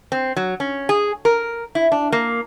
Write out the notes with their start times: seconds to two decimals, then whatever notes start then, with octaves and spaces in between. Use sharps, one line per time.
0.12 C4
0.36 F#3
0.60 C#4
0.89 G#4
1.25 A#4
1.75 E4
1.92 D4
2.12 A#3